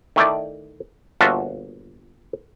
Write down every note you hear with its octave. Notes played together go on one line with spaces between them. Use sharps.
D#3 A3 E4 D5
G1 A#2 F4 F#4 E5 A5